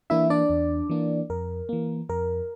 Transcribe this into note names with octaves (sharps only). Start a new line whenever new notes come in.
E3 A#3 D4 E4 E5
D4 D5
E2
E3 A#3 D4
F2 A#4
E3 A#3
F2 A#4